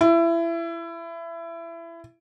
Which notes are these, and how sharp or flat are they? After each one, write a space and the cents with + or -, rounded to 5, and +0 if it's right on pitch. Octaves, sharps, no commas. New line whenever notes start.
E4 +25